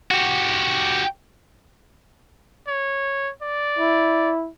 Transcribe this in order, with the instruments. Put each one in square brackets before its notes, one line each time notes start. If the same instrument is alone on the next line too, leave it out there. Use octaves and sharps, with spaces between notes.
[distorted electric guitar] F#4 G4
[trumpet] C#5
D5
[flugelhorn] E4